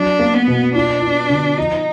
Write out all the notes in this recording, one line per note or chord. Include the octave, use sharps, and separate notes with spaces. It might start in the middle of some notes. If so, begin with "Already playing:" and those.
Already playing: F#3 D4
A#3
B3
B2
D4 F4
F4
D3
F3 D#4